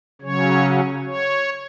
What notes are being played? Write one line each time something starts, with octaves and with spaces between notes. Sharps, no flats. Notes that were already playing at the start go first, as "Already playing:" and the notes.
C#3 F#3 C#4 C#5
C#5